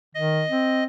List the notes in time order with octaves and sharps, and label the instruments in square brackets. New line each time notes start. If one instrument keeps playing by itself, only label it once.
[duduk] D#3 [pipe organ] D#5
[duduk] C4